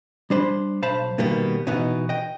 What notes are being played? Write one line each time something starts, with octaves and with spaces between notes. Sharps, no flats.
G3 D4 C5 B5
B1 C5 F5 A5 B5
B2 D#3 G3 A#3 B3
B2 E3 B3 D#4
D#5 G5